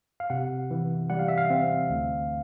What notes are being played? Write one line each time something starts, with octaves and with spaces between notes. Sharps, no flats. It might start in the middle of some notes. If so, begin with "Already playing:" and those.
F5
C3 F#5
E3
G3 F#5
F5
E5
F5
C4
D2